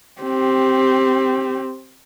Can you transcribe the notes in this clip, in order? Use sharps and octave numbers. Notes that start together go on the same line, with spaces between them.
C4 G4